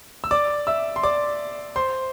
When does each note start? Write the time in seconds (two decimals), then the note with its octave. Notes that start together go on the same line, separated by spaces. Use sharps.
0.24 E6
0.31 D5 D6
0.67 E5 E6
0.96 C6
1.03 D5 D6
1.76 C5 C6